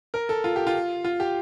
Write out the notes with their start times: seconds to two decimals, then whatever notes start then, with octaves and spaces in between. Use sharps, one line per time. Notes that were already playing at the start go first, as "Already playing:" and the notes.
0.14 A#4
0.29 A4
0.44 F4
0.56 G4
0.67 F4
1.04 F4
1.20 G4